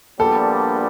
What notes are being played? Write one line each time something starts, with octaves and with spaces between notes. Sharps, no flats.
A#1 A#2 G3 B3 D4 A4